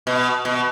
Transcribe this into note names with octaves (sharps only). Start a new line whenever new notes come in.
B2
B2